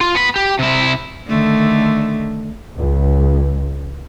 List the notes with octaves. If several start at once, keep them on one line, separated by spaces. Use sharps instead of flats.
F4
B3 B5
G4
C3 E4
D3 D#3 A3
C#2